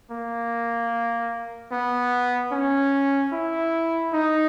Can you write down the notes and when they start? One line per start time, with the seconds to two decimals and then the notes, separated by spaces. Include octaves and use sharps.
0.11 A#3
1.72 B3
2.52 C#4
3.33 E4
4.13 D#4